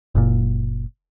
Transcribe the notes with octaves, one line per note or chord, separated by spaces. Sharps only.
F#1 A#2